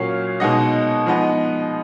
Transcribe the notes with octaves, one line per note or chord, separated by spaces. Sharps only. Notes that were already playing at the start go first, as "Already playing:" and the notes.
Already playing: A#2 F#3 C#4 C#5 F5
B2 G#3 D#4 D#5 F#5
F3 G#3 B3 D#4